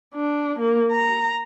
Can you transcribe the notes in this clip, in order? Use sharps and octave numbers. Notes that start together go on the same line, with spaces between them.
D4
A#3
A#5